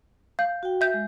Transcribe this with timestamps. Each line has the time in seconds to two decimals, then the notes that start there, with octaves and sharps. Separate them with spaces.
0.39 F5 G6
0.63 F#4 G5
0.81 E5 G6
0.94 G#3